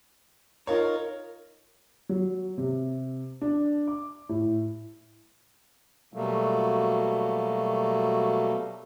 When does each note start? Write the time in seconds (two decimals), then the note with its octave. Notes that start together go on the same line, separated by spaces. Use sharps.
0.67 D#4 F4 A#4 C#5
2.09 F#3
2.58 C3
3.41 D4
3.87 D6
4.29 A2
6.14 B2 F#3 G3 A3 A#3